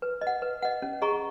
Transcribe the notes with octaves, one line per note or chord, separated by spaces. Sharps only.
B4
D#5
F#5
B4
D#5 F#5
C#4
G#4 D#5 A#5 C#6